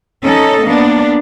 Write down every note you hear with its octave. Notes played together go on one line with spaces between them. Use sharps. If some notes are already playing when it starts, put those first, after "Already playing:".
C#4 D#4 A4 D#5
A#3 B3 D4